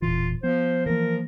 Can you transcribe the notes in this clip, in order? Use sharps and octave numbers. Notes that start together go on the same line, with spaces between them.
E1 A#2 E3 F4
F3 B3 C5
E3 A#3 A#4